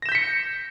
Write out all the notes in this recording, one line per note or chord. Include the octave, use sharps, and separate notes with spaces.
G6 A#6 B6 C#7 E7